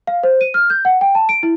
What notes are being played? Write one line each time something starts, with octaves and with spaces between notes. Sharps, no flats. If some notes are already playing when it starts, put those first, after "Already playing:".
F5
C5
D#7
F6
G6
F#5
G5
A5
D7
E4